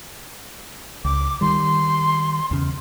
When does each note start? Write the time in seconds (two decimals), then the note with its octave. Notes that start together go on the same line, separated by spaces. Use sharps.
1.05 C#2 D6
1.41 D#3 G3 C6
2.51 E2 C#3